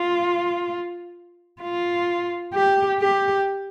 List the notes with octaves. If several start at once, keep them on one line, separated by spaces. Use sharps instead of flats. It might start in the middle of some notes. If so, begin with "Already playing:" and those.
Already playing: F4
F4
G4
G4